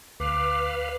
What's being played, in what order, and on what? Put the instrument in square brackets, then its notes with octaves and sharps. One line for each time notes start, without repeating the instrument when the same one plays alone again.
[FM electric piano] D2 [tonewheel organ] B4 F5 [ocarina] D6